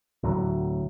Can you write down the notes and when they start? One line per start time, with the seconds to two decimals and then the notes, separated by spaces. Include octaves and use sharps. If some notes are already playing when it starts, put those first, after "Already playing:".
0.23 D2 A2 F#3